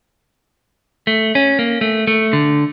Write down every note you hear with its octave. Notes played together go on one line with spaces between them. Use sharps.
A3
C#4
A#3
A3
A3
D3